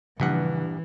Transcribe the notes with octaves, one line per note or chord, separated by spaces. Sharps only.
A#1 G2 C#3 E3 F3 F#5